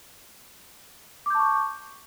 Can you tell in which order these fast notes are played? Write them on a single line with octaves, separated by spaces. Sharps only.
D6 G6 A5 C#6